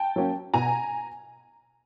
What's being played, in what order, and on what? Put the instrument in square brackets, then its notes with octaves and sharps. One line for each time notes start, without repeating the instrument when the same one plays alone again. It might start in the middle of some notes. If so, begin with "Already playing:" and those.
Already playing: [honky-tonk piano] G5 A5
F#3 A#3 C#4
B2 G#5 A#5